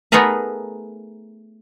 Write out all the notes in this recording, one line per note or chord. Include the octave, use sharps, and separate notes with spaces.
A3 B3 D#4 G#4 A#4 B4